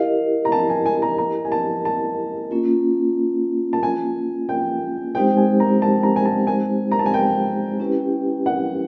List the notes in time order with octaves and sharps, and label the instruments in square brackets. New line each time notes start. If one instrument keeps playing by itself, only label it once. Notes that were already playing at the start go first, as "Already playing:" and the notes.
Already playing: [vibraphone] E4 G4 A#4 D#5 [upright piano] F5
[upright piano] A#5
A5
G#5
G#5
A#5
A#5
G#5
A5
A5
[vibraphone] A#3 C#4 F4
[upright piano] A5
G#5
G5
[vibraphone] G#3 C4 D#4 G4 C5 [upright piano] G5
[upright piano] G#5
A#5
A5
A#5
G#5
A5
G#5
A#5
A5
G#5
G5
[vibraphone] C#4 E4 G4 B4
[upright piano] F#5